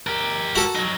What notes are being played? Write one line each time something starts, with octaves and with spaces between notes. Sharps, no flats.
G4 A#4
F#4 A4
F#3 D#4